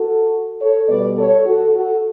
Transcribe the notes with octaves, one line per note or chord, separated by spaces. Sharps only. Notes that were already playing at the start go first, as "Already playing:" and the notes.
Already playing: F#4 A4
A4 C#5
B2 G3 B3 B4 D5
A4 C#5
F#4 A4
F#4 A4